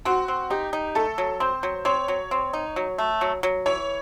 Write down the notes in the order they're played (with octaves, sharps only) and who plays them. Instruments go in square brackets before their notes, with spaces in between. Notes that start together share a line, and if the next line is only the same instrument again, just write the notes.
[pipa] C4 [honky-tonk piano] F#4
[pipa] C4
[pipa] D#4 [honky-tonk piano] G4
[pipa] D#4
[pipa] A3 [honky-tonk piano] A4
[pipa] F#3
[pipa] C4 [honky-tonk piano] C5
[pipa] F#3
[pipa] C4 [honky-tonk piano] C#5
[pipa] F#3
C4
D#4
F#3
A3
F#3
F#3
[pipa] E3 [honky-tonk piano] C#5